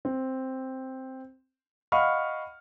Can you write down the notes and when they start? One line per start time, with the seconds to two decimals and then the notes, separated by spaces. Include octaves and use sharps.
0.05 C4
1.92 D#5 F5 F#5 B5 C#6 F6